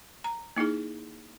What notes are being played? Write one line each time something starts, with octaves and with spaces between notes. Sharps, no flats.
A#5
A#3 D#4 E4 G#4